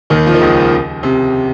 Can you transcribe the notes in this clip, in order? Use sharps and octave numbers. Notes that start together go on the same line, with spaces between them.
D#2 D#3
F3
D#3
C#2 C#3
C3